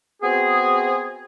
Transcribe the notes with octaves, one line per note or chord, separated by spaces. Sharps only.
B3 C4 F#4 G#4